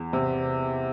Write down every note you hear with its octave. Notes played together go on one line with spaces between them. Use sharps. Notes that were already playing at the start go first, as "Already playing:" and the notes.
Already playing: E2
C3